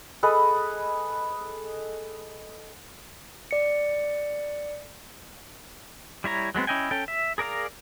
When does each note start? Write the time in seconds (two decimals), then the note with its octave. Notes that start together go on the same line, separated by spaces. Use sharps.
0.23 G#4 A4 B4 D#5
3.51 D5 C#7
6.24 G3 E4 C#5 A#5
6.55 F#3 G#3 B3 C4
6.67 C#4 E4 D#5 G5 G#5
6.91 C#4 A4 G5
7.08 E5
7.38 G#4 A#4 D5 F5 A#5